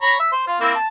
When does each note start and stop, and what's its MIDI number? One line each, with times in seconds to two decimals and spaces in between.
0.02 0.15 73
0.02 0.15 82
0.02 0.15 83
0.19 0.29 76
0.32 0.46 72
0.47 0.58 65
0.61 0.74 58
0.61 0.74 60
0.61 0.74 64
0.76 0.87 81